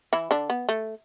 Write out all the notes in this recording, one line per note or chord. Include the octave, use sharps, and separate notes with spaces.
E3 E4
D3 D4
B3
A3